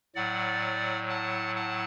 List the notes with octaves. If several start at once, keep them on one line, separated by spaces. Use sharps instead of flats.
A2 F#3 D5 F#5
F#5 A5
F#5 A5